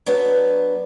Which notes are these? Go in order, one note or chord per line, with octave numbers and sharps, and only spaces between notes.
F#3 B3 D4 A#4 B4